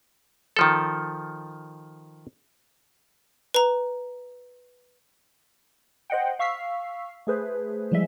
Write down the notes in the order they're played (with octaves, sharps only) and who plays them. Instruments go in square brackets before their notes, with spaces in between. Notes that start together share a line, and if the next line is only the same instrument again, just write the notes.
[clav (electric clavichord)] D#3 F3 A4
[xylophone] B4 A#5
[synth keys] C5 D#5 F#5 G5
F5 C#6 E6 B6 C7
A3 G#4 B4 C5
E3 F3 G3 G#3 E5